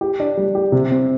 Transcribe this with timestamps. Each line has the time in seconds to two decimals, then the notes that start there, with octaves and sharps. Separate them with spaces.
0.01 G4
0.20 D4
0.37 G3
0.55 G4
0.72 C3
0.91 C4